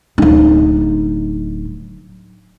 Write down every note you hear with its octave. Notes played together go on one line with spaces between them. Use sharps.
D1 D#4